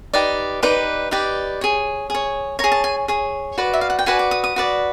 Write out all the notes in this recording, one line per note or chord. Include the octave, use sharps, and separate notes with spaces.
D#4 G4 B4 D5
D#4 G4 B4 D5 D6
D#4 G4 B4 D5
G#4 C#5
G#4 C#5
G#4 C#5 A#5
A5
G#5
G#4 C#5
F#4 B4 D5
E5
F5
F#5
G5
F#4 B4 D5 G#5
D6
D#6
D#6
F#4 B4 D5